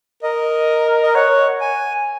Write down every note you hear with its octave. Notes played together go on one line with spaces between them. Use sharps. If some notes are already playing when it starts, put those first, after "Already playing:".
A#4 D#5
D#5
C#5 F#5
G#5